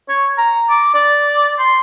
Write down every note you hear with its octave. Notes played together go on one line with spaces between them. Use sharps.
C#5
A#5
D6
D5
C6